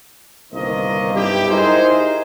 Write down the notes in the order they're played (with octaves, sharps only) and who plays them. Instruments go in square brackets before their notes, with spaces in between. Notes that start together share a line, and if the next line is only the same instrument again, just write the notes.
[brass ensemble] G1 C2 D#3 A#3 C5 D#5
B1 G2 E4 G4
D#4 E4 G#4 A#4 C5